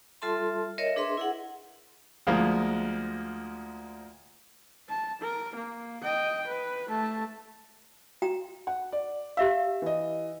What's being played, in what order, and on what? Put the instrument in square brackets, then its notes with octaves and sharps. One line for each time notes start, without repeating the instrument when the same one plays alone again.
[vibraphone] G3 F4 A4 E5 A5 C6
A#4 C#5 D#5 E5
D4 G#4 B4 E5 C6
E4 G#4 F#5
[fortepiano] D2 F3 G#3 A#3
[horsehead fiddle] A5
A#4
A#3
D#5 G5
B4
A3 A5
[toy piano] F#4 G5 A#5
[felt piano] F#5
D5
[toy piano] G4 E5 F5 [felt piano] E6
[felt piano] E3 D#5